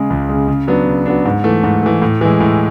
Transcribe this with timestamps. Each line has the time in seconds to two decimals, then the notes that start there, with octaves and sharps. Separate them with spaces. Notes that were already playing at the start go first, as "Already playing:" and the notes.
Already playing: C#3 G#3
0.10 C#2
0.29 C#3 G#3
0.48 C#3
0.68 F#3 B3 D4
0.86 C#3
1.06 F#3 B3 D4
1.26 G#2
1.44 E3 A3
1.64 G#2
1.83 E3 A3
2.02 A2
2.21 E3 G#3
2.40 A2